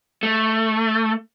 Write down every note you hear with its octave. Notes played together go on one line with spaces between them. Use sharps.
A3